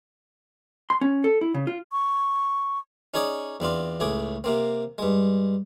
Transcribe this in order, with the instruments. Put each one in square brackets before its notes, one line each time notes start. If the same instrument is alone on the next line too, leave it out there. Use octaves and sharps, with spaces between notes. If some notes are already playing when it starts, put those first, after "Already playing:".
[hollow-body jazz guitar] C6
C#4
A4
E4
C#3
F4
[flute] C#6
[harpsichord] C#4 D#4 G#4 C#5 D5
E2 C4 D4 F4
C#2 A2 G#4 D6
C3 A#3 C4
G2 G#3